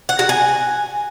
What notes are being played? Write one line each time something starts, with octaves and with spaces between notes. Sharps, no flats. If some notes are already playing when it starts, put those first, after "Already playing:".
F#5
F#4
G#5